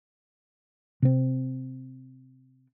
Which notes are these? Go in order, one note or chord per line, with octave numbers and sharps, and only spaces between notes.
C3 C4